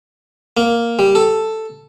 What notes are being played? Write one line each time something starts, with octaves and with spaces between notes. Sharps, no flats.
A#3
G3
A4